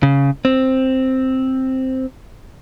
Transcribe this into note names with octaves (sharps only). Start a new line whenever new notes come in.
C#3
C4